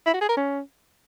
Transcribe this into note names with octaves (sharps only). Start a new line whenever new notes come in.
E4
F#4
G#4
A#4
C#4